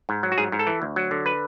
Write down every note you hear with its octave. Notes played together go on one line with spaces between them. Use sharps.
G#2
F#3
F#4
G#2 G#4
G#2
A4
E3
D2
F#3
D3
B4